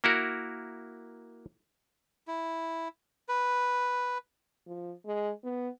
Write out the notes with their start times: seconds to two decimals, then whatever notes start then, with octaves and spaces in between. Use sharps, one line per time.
0.04 A#3 E4 F#4 A#4
2.28 E4
3.29 B4
4.67 F3
5.05 G#3
5.44 B3